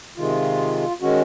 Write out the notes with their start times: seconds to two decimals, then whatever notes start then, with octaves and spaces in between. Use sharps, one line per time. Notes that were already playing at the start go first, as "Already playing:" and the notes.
0.18 C3 D#3 G#3 F4
1.02 D#3 G#3 C#4 F#4